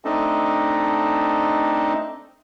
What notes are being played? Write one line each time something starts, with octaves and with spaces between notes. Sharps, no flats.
A3 C4 D4 D#4 A4 D#5